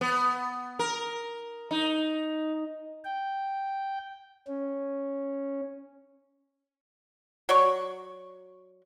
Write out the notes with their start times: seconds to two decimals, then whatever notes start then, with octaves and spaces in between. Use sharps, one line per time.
0.01 B3
0.79 A#4
1.71 D#4
3.05 G5
4.47 C#4
7.49 F#3 C#5 D5 C#6